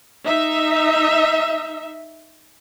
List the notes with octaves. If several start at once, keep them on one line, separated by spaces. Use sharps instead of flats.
D#4 E5